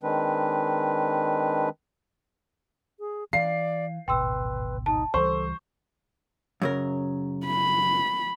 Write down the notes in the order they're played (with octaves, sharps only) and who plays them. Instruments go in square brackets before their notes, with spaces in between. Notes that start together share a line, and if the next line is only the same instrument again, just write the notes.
[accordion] D#3 G#3 C4 D4 B4
[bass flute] G#4
[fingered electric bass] E3 [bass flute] D5 [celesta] F5 [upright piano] C7
[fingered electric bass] D1 G#1 B2 [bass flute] B4 [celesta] G5 C6 E6
[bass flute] D#4 [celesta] A5
[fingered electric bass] C#2 E3 G3 [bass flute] A4 [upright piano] C5 [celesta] C#6
[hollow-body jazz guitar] F#2 C#3 A#4
[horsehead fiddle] B5